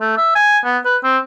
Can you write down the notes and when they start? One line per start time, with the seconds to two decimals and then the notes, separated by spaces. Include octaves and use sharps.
0.01 A3
0.17 E5
0.35 G#5
0.65 B3
0.85 B4
1.03 C4